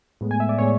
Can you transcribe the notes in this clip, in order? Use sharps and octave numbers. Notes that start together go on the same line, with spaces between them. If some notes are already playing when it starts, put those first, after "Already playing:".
A2 G#3 B3
G#5
E5
D5
A2 G#3 B3 C#5